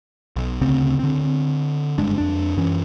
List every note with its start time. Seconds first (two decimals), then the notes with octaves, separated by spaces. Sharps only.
0.36 B1
0.61 D2 C#3 C4
0.99 D3 C4
1.98 F#1 G2 G#3 D4
2.18 F2 D4
2.57 F#2 E3 C#4